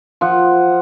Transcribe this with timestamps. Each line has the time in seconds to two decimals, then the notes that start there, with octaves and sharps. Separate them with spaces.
0.21 F3 F#5